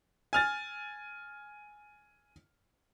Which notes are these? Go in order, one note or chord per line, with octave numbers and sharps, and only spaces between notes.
G#5 F6 A6